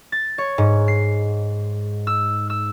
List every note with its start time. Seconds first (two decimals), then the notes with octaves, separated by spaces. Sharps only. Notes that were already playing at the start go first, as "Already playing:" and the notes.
0.12 A6
0.38 C#5
0.58 G#2
0.88 C7
2.07 E6
2.50 E6